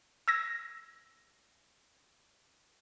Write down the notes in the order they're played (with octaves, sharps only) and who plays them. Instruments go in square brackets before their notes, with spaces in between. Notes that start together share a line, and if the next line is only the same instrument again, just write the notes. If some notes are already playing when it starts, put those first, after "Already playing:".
[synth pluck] E6 G#6 A#6